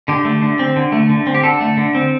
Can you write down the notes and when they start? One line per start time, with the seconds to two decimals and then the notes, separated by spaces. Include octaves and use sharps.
0.08 D3 G4
0.25 A3
0.42 D3
0.59 C4
0.76 D3
0.92 A3
1.09 D3
1.27 C4
1.34 G4
1.43 D3 A4
1.60 A3
1.77 D3
1.95 C4